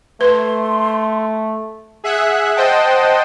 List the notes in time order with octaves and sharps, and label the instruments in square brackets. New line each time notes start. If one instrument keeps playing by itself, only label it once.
[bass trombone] A3 [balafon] B4 [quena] C6
[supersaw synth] G#4 E5 F#5 F#6
C5 D#5 F#5 G5 A5